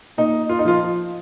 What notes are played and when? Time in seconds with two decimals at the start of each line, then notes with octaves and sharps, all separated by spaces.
0.18 A#2 D#4
0.49 F4
0.59 D#4
0.65 F3 F4